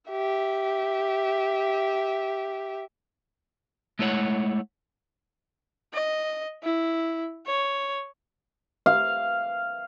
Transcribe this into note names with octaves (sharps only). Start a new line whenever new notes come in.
G4 E5
G#3 A3 E4 C#5 F#5
D#5
E4
C#5
F5